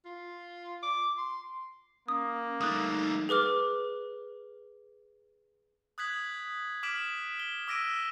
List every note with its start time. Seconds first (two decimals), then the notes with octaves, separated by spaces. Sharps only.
0.05 F4
0.83 D6
1.18 C6
2.08 A#3 C#4 D#6
2.61 G3 A3 D#4 D#6 F#6
3.29 G#4 B4 D6 F6
5.98 D#6 F#6 G#6 B6 F#7
6.83 D6 F6 B6 D7 E7 F#7
7.40 G7
7.68 D6 E6 A#6 D7 D#7